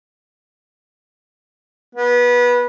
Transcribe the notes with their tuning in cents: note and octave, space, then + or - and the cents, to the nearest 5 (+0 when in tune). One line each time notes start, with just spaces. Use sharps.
B3 -20